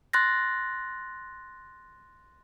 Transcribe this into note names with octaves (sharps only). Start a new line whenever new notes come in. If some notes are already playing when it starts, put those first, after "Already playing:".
C6 F#6 A6 A#6